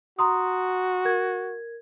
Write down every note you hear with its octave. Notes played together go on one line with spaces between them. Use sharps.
F#4 A#5 C6 D#6
A#4 G#6